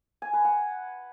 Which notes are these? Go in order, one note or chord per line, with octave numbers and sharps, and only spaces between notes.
G#5
B4
F#5